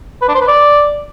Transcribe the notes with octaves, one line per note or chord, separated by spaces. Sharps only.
B4
D4
C5
B4
D5